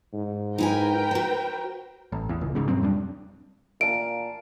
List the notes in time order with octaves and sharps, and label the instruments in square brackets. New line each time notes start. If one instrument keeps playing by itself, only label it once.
[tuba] G#2
[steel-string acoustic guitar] D#4 E4 G#5 [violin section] A#4 B4 G5
[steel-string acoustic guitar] F#4 C5
[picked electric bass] A1
E2
D#1 C#2
C#2 G#2 C#3
G2 B2 F#3 C4
F2 G3 A#3 D4
[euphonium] A#2 [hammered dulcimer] F5 A5 [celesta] D7